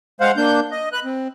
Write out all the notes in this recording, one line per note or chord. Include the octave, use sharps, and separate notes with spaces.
G#3 C5 F5 F#5
A#3 D4 G6
D#5
B4 F#6
C4